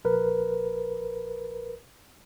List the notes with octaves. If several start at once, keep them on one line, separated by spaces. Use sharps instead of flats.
A#1 A#4 B4